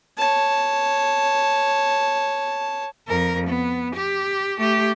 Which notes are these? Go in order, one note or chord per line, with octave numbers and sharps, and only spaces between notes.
C#5 A5
F2 A#4
B3
G4
A3 G4